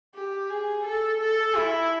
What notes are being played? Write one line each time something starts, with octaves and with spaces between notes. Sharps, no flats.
G4
G#4
A4
A4
E4